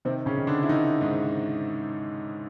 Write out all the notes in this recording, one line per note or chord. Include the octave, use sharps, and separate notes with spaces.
C3 D#3 C4
C#3 C#4
D#3
D3 D4
E4
D#3 D#4
G#2